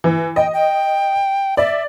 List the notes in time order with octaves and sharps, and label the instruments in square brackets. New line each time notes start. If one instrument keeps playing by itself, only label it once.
[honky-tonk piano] E3
[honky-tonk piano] D#5 [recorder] G5
[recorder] G5
[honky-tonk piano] D5 [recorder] E5